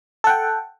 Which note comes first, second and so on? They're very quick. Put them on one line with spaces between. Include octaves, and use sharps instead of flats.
A4 F#5 G5